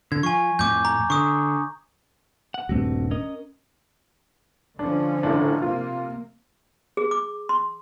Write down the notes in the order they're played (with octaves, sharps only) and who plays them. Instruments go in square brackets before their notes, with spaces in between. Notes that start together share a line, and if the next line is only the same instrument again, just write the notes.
[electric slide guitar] D3 [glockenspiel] G#6
[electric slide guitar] F3 [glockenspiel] G#5 C#6
[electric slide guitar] F2 A2 [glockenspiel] D6 G6
[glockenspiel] A#5
[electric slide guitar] D3 [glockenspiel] C#6 D#6
[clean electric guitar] F#5
[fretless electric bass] D#1 G2 [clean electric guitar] A3 C4 F#4
[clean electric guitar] C#4 A#4 D#5
[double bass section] D3 F3 C#4 [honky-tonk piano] D4
[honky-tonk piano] F#1 A2 D4
[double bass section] C3 A#3 [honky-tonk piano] F4
[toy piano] G#4
D6
C6